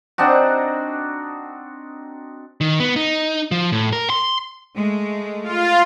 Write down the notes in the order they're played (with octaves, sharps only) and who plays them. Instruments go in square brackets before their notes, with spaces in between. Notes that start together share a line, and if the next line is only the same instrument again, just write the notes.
[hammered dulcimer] C4 D4 D#4 F#4
[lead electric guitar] D#3
B3
D#4
F3
A2
A#4
C6
[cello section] G#3 A3
[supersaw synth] F4